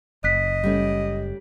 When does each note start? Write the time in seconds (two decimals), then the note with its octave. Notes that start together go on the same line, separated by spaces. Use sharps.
0.24 F#1 D#5 F#6 B6
0.64 G3 A3 C#4